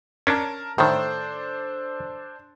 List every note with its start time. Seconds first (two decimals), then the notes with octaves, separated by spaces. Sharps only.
0.27 C#4 D4 A#4 A5
0.78 A2 D#3 D4 A4 C5